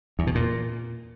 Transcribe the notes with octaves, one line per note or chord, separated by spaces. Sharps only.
E2
B2
A#2